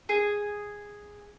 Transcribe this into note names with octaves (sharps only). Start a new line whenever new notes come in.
G#4